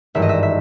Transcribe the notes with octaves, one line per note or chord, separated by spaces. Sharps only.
G#1 G2 E3 E5
D#5
E5
E5